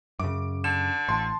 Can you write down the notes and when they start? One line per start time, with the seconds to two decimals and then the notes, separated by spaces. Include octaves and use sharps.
0.20 F#2 C#3 D6
0.64 D3 E7
1.09 A1 A5 C6